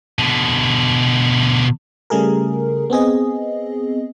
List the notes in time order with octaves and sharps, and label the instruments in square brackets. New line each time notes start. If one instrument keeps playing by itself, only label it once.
[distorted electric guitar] B2 D3
[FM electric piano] C#3 G3 A3 G#4 A#4
B3 C4 G#4 D#5